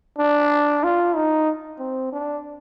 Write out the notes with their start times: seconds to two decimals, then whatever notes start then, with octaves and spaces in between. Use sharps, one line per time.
0.19 D4
0.84 F4
1.16 D#4
1.79 C4
2.13 D4